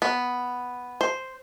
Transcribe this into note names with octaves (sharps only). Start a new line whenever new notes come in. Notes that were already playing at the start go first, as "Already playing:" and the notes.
B3
C5